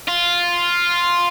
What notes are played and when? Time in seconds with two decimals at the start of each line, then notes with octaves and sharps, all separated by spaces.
0.08 F4